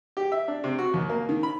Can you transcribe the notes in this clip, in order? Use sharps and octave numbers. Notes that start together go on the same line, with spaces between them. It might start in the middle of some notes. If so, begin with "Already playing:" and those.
G4
E5
D4
C3
F#4
D#2
A#3
D#3
B5